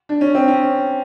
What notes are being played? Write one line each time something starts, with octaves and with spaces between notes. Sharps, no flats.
D4
C#4
C4
C#4